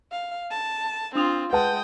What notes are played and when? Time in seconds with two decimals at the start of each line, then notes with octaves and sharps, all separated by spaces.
0.12 F5
0.50 A5
1.15 C4 D4 F4 D#6 F7
1.53 G#3 B4 F#5 G5 A5 D#6